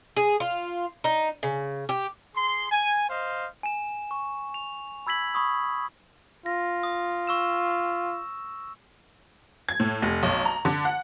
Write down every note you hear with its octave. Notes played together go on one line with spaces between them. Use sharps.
G#4
F4
D#4
C#3
G4
G#4 C6
G#5
C5 D#5 F5
G#5 E7
C#6
F7
B5 E6 G#6 B6 F#7
B5 C#6 D#6
F4 A#6
D#6
C#6 E6 E7
G#6
A2
F1
B1
A#5
D3
F#5